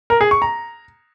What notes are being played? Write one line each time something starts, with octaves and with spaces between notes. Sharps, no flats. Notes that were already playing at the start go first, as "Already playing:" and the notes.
A#4
G#4
C#6
A#5